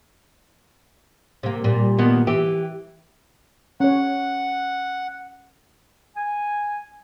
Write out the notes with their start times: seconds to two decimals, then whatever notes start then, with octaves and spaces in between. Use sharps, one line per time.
1.43 C3 A#3
1.64 A#2 G3
1.99 A#2 D#3 B3
2.27 E3 G4
3.80 C#4 C#5 F#5
6.17 G#5